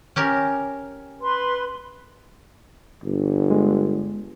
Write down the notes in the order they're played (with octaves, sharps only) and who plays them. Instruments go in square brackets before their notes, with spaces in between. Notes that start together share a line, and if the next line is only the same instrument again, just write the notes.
[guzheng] C#4 G4 A#4
[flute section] B4 C6
[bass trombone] G1
[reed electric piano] G#3